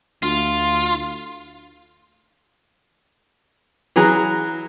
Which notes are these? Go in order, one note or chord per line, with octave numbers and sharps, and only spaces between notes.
D2 F4
E3 F#3 G#4 A#5 F#6